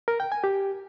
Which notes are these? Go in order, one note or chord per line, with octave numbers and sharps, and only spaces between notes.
A#4
G5
G#5
G4